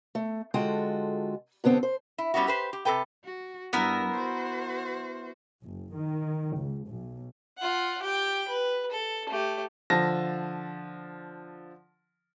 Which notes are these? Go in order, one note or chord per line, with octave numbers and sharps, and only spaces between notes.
A3
D3 G#3 F4 F#4 A4 G5
G2 D3 B3 C4
C5
E4
G3 B3 C#4 E4 F#4
G4 B4 C5
G4
C3 F#3 A4 B4 G5
F#4
G2 B3 E4 A#4
F#4 C5
F#1
D#3
C#2
B1
F4 F#5
G4 G5
B4
A4
A3 G4
D3 F3 A5 A#6